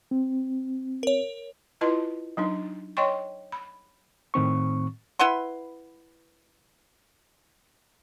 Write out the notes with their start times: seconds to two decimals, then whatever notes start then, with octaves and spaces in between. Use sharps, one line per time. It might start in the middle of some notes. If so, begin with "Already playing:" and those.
0.11 C4
1.03 A#4 C#5
1.81 E4 F4 B4 D#5 A5 C6
2.37 F#3 D4 D#4
2.97 C#5 D#5 G5 C6 C#6
3.52 B5
4.34 A2 D#3 C4 C#6
5.19 E4 B4 F#5 C6